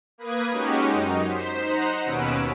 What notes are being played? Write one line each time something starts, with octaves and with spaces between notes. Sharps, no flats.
A#3 B4 D#6 G#6
G#3 C#4 D#4 F#4 G4
F#2 D#4
C5 B6 E7
D#4 C5 F#5 A#5
D#2 B2 C#4 B4 E6 D7